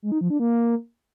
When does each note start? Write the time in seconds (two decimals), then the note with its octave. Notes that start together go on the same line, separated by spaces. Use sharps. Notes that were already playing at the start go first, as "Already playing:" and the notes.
0.02 G#3
0.12 D#4
0.21 F3
0.30 D4
0.39 A#3